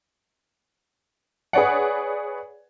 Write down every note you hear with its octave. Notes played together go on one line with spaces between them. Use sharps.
G#4 B4 C#5 D5 F#5